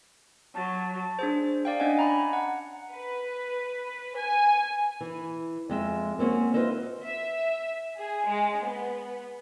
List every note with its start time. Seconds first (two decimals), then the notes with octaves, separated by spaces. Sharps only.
0.55 F#3 A5
1.19 D4 G#4 C5
1.65 D5 F5 G5
1.80 C#4 D4 D5 D#5 F#5 G#5
1.97 G#5 A#5 B5
2.33 F#5
2.93 B4
4.16 G#5
5.01 E3
5.69 F2 G#3 E5
6.19 A#3 C4 C#4 F#4
6.54 F4 B4 C5 D#5 E5
7.04 E5
7.99 G#4
8.28 G#3
8.65 B3